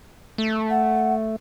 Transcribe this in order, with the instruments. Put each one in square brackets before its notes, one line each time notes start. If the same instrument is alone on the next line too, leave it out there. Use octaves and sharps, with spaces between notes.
[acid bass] A3
[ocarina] F#5